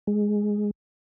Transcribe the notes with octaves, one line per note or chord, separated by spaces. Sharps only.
G#3